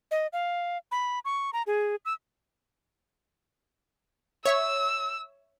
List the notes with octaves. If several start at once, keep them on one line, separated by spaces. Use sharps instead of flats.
D#5
F5
B5
C#6
A#5
G#4
E6
C#5 E5 C#6 E6